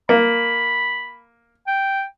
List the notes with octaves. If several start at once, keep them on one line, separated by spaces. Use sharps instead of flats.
A#3 B5
G5